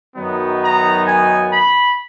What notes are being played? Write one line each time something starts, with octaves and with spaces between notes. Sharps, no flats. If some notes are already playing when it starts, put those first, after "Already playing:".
F#2 D#3 F#3 B3 D#4
A#5
G#5
B5